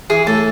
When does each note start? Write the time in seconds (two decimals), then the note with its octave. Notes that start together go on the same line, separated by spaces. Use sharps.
0.10 E3 G#4
0.27 A2 A4